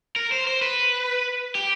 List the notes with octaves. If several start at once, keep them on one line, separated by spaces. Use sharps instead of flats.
A#4
C5
C5
B4
G4